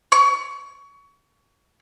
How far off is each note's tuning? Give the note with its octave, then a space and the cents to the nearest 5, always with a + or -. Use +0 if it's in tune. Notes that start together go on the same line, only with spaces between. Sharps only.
C#6 +25